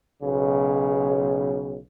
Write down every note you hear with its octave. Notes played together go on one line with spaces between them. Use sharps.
B1 C#3